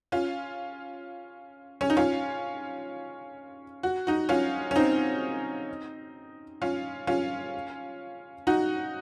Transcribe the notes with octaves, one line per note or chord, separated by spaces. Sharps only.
C#4 F4
C#4
D#4
C#4 F4
F#4
D#4 F#4
C#4 F4
C#4
C4 D#4
C#4 F4
C#4 F4
D#4 F#4